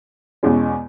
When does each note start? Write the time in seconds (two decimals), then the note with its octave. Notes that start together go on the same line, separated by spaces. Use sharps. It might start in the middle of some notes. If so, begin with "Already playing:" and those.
0.43 E2 B2 G#3 C#4